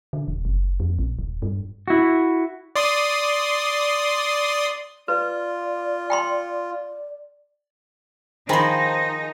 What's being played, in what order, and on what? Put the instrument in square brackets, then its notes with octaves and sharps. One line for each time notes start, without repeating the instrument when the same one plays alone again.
[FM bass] D3
D#1
F#1
F2
A#1
D#1
G2
[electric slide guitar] E4 F#4
[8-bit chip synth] D5 C6 D#6
[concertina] F4 [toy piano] B4 [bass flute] D5
[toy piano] G5 B5 C6
[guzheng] D#3 F3 [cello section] D#4 [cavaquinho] G#4 B5 C6 [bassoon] C5